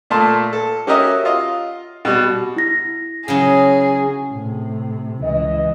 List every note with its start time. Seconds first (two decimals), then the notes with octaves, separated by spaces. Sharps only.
0.10 A#2 A3 A#3 A5 C6
0.53 A4
0.87 C#4 F#4 G4 A#4 D#5 E5
1.25 F4 D#5
2.05 B2 G3
2.56 E4 A#6
3.28 C#3 F#3 G#4
4.32 A2 C3
5.24 C#2 E3 D#5